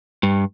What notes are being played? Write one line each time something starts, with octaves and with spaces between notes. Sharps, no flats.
G2